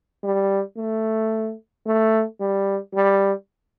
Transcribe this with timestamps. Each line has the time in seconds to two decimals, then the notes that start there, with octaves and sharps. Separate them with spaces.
0.24 G3
0.77 A3
1.86 A3
2.40 G3
2.95 G3